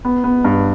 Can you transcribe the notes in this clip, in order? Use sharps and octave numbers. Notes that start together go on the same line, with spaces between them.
B3
B3
G2